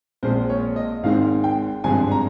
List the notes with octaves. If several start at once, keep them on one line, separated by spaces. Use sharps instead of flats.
A#1 A#2 G#3 C4 C5
C#5
D#5
G#1 G#2 D#3 G#3 C4 F5
G5
G#1 G2 F3 G#3 C4 G#5
A#5